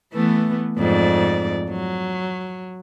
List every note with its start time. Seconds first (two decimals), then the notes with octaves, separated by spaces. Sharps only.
0.13 E3 A3 B3
0.77 F2 G#2 D5
1.69 F#3